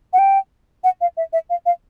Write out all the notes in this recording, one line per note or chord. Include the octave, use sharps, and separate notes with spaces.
F#5
G5
F#5
F5
E5
E5
F5
F5